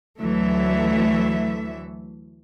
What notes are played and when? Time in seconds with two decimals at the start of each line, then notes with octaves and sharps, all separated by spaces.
0.20 D2 E3 F#3 A3 E5